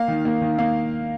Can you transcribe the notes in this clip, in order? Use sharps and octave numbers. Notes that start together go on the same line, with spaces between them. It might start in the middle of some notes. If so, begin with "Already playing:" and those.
Already playing: A#3 F5
D#3
A#3
D#3
A#3 F5